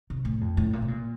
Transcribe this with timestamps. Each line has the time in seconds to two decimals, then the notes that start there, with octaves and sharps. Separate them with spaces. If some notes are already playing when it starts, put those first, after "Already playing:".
0.10 C3
0.25 A2
0.41 F2
0.57 A2
0.73 A#2
0.82 C3
0.88 A#2